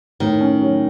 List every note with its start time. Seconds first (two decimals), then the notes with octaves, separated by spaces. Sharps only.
0.20 A2 D#3
0.41 C#4
0.62 F#3